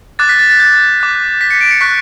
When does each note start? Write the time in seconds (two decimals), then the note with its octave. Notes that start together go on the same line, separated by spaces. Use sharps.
0.19 D6 F#6 A6
0.29 B6
0.39 A6
0.50 A6
0.60 G6
1.00 D6 F#6
1.41 B6
1.51 C#7
1.61 D7
1.71 C#7
1.81 C#6 F#6 B6